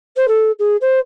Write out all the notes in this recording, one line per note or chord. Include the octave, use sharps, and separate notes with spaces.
C5
A4
G#4
C5